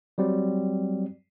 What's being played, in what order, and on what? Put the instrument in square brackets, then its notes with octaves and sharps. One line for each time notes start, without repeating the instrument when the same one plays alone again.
[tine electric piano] F#3 G3 C4